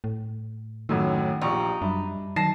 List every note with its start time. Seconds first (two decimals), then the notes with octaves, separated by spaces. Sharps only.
0.04 A2
0.89 A1 F#2 A2 D#3 F#5 G5 E6
1.42 A#1 D#4 G4 C#6
1.82 F#2 G3 D4 E5 B5
2.36 D#3 F#3 A5 A#6 C7